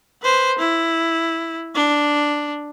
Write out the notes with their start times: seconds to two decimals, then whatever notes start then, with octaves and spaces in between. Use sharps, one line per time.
0.22 B4 C5
0.58 E4
1.75 D4